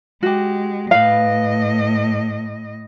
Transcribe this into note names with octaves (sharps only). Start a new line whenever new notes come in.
G#3 F#4 G4
A2 B4 D#5 F5